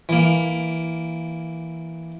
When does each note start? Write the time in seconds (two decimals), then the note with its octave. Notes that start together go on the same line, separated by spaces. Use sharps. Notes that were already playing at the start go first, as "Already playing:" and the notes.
0.09 E3 A#3